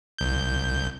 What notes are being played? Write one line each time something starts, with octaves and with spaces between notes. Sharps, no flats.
C2 G6